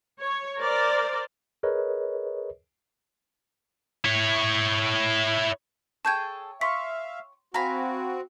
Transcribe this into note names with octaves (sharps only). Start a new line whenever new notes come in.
C#5
A#4 C5 D5
G#4 A#4 B4 C#5 D#5
E4 C#5
G#4 A4 C#5 G5 A5 G6 G#6
E5 F5 C6 C#6 B6
C4 F#4 F5 G#5 A#5 B5